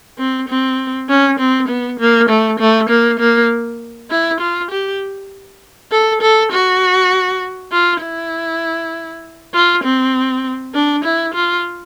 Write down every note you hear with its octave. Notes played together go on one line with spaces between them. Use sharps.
C4
C4
C#4
C4
B3
A#3
A3
A3
A#3
A#3
E4
F4
G4
A4
A4
F#4
F4
E4
F4
C4
D4
E4
F4